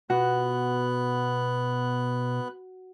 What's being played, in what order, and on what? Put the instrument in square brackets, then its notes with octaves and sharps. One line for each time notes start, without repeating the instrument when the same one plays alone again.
[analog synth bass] B2 [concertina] B3 F#6 [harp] F#4